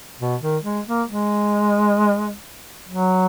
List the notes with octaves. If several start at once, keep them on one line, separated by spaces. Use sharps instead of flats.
B2
D#3
G#3
A#3
G#3
F#3